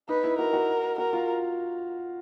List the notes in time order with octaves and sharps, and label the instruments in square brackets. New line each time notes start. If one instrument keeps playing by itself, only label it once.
[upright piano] D#4 [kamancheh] B4
[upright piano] E4
[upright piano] F#4 [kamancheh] A#4
[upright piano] F#4
[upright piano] F#4 [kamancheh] A#4
[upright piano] F4